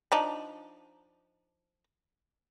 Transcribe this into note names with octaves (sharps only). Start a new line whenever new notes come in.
F3 D4 D#4